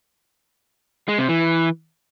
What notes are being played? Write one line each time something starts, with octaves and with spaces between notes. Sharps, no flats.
G#3
C3
E3